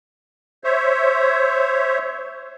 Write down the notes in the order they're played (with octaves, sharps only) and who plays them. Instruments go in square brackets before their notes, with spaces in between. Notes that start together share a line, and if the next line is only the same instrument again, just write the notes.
[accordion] C5 C#5 E5